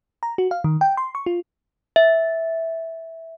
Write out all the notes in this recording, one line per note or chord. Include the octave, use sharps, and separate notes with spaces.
A#5
F#4
F5
D#3
G5
C6
C#6
F4
E5